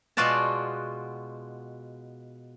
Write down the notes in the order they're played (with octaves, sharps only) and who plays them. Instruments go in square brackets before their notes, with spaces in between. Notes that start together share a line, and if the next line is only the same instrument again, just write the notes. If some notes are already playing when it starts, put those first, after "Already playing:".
[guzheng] B2 G#3 F4 F#4 D5 A5